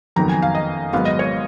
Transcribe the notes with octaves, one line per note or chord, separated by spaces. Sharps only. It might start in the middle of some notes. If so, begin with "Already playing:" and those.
F#1 F2 D#3 F#3 B3 A#5
G#5
F5
D#5
G#1 G#2 F#3 B3 F5
D#5
C#5